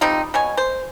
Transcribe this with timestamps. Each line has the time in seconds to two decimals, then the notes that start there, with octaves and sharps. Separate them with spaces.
0.01 F3 G3 C4 D#4
0.34 B2 C#5 G#5
0.57 C5